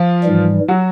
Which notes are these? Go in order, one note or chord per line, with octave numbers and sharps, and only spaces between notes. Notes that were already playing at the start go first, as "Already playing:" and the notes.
Already playing: F3 F4
G#2 E3 G3
F#3 F#4